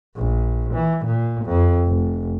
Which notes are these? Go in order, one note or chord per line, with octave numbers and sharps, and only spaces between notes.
A#1
E3
A#2
F2
F1